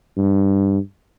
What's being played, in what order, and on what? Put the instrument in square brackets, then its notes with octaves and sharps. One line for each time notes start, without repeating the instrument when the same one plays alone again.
[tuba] G2